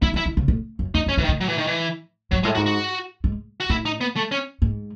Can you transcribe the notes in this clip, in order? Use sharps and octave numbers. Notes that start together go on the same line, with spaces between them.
D#3 E4
E3
E4
D#3
C#3
A2
F#2
E2 D#4
F#2
C#4
G#2 E3
D#3
A2
F#3
E3
D#3
E3
G#2 F#3
A2 G#3
G#2 F#4
F#4
G#2
F#4
A2 E4
D#4
B3
A3
C#4
G#2